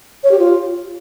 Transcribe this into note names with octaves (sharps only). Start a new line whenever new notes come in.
C#5
G4
F4